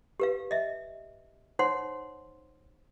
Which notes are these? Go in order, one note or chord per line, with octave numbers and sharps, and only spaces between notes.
G4 B4 F5
D#5 E5
D#4 C5 C#5 F#5 C6